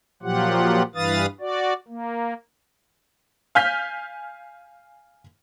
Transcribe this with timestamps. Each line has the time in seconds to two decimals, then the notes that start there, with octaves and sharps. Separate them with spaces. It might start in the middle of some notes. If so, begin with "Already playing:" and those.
0.23 A#2 F3 F#3 F4 G4 F#5
0.95 G2 E3 B4 F5 D#6 A6
1.40 F#4 D5
1.88 A#3
3.55 F5 G#5 F6 G6 B6